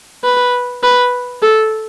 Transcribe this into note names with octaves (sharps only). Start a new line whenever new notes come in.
B4
B4
A4